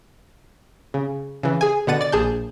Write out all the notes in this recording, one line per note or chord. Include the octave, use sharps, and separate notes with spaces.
C#3
C#3 E3
G#4 G#5
B2 D3 F#5 A6 D#7
D5 A6
A#1 G#4 A5 G6